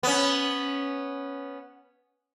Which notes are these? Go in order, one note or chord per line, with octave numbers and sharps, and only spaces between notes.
B3 C#4